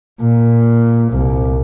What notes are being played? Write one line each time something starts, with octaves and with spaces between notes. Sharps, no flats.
A#2
C2